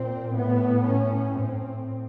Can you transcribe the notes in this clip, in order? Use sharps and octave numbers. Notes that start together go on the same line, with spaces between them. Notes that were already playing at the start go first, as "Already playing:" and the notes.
Already playing: A#2 C4
A2 B3
C#4
A2 C4